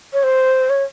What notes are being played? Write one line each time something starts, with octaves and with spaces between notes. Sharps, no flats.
C#5
C5
C#5